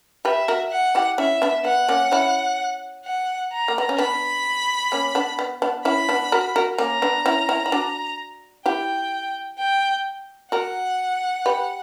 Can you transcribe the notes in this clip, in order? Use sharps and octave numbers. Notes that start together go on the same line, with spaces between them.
G4 B4 E5
F#4 A#4
F#5
E4 G4
C#4 E4 E5
B3 D4
B3 F#5
A#3 C#4
C#4 E4
F#5
A#5
A#3
B3
C#4
B3 D4 B5
A#3 C#4
B3 D4
B3
B3 D4
C#4 E4 B5
B3 D4
F#4 A#4
F#4 A#4
A#3 C#4 A#5
B3 D4
C#4 E4
C#4 E4
E4
D4 F#4
E4 G4 G5
G5
F#4 A#4 F#5
G4 B4